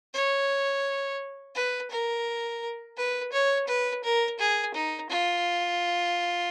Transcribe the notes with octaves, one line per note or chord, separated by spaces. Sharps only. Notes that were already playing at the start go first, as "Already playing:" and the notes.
C#5
B4
A#4
B4
C#5
B4
A#4
G#4
D#4
F4